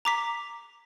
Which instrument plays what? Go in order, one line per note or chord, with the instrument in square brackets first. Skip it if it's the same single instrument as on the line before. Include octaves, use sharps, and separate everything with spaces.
[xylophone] A#5 D6 B6